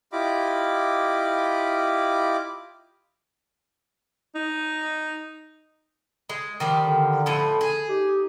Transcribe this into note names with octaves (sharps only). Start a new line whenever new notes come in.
E4 F4 G4 D#5 B5 D6
D#4
G#3
D#3 F3 G3
D3
A2 F3 B4
G#4
D#4 G4